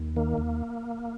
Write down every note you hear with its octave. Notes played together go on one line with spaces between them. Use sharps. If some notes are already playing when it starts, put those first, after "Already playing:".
Already playing: D#2
D#3 A#3
D#2